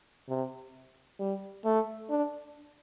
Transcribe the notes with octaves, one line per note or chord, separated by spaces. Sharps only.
C3
G3
A3
D4